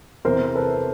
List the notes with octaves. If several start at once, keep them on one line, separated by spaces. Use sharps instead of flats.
E2 C3 E3 A#4 C5
A4 B4